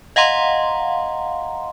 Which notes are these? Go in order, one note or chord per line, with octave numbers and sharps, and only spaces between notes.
D#5 F5 F#5 A#5 C6